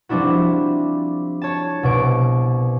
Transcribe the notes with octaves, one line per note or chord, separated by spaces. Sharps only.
F3 G3 C4 D4 E4 F#4
C#5 A5
C2 B2 C#6 D7